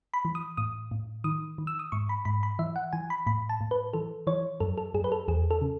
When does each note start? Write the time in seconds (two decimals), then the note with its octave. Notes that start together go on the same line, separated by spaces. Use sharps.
0.14 B5
0.25 E3
0.35 D#6
0.57 A2 D#6
0.91 A2
1.24 D#3 D#6
1.58 D#3
1.67 E6
1.79 D#6
1.92 G#2 C#6
2.09 B5
2.25 G#2 B5
2.43 B5
2.59 E3 E5
2.76 F#5
2.93 E3 G#5
3.10 B5
3.27 A2 B5
3.49 A5
3.61 A2
3.71 B4
3.93 E3 A4
4.27 E3 C#5
4.60 F#2 A4
4.78 A4
4.94 F#2 G#4
5.04 B4
5.12 A4
5.28 E2 G#4
5.51 A4
5.61 C#3